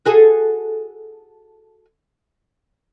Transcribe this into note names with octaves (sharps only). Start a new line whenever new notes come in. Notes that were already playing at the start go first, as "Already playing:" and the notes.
F#4 G#4 A4